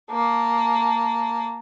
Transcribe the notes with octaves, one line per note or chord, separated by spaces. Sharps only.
A#3 A5